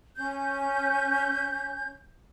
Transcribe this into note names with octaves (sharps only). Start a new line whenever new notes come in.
C#4 G6